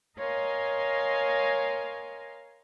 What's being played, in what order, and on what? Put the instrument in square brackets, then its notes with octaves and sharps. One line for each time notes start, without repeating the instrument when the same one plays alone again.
[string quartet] A#4 C#5 D#5 F5 G#5 C6